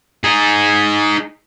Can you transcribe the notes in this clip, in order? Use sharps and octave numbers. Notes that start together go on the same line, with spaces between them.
D#4 G#4